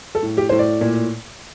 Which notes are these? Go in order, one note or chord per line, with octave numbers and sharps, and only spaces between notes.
A4
A2
G4
A2 C5
D5
A#2